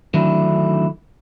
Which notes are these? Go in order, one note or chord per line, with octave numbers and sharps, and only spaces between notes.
D3 D#3 F#3 A3 D4 E4